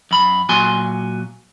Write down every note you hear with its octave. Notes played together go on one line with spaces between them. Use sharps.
F#2 B5
A#2 F#3 F#4 G#5 C6